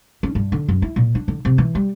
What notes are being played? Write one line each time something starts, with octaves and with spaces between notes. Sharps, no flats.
C#4
G2
D3
F#2
E4
A#2
D4
D3
C3
E3
G3